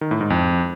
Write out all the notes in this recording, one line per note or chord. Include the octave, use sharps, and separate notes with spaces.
D#3
A2
G#2
F2